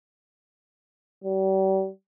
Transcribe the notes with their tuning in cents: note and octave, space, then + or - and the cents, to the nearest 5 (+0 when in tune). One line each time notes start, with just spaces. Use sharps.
G3 -40